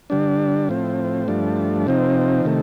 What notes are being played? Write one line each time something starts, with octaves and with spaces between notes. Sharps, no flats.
D3 G3 D4
A2 F3 C4
G2 F3 A3 D4
C3 F3 C4 D#4
C3 D#3 A3